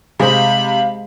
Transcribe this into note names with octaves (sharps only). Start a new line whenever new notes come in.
C3 G#3 G#4 C5 F5 B5